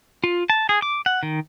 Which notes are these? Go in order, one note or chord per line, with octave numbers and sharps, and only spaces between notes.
F4
A5
G#4
D6
F#5
D#3